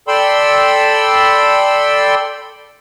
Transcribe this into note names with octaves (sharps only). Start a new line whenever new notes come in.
A4 D5 G5 B5 C6 E6